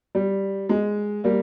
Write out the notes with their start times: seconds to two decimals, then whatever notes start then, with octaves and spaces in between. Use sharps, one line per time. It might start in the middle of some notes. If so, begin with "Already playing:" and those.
0.15 G3
0.69 G#3
1.24 G3 A#3